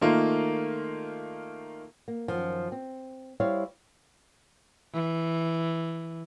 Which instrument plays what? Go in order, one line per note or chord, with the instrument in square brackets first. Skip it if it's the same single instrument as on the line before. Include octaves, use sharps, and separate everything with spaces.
[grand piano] D#3 A3 A#3 F4
[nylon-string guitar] A#3
F#2 A#2 D#3 F3
C4
G3 E4 C5 C#5 F5
[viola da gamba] E3